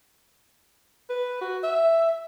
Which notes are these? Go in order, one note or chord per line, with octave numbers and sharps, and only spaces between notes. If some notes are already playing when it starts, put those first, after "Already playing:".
B4
F#4
E5